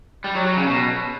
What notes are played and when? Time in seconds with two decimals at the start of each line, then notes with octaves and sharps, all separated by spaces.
0.24 G3
0.35 F#3
0.46 F#3
0.57 C#3
0.68 B2